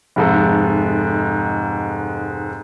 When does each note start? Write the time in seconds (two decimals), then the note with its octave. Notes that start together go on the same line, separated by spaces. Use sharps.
0.16 F1 G#2 A4